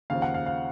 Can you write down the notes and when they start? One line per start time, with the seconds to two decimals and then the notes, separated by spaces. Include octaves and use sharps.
0.10 D#2 C#3 F3 F5
0.22 F#5
0.34 F5
0.46 F5